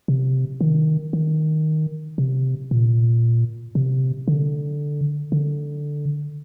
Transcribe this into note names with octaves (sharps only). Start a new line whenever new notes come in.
C3
D#3
D#3
C3
A#2
C3
D3
D3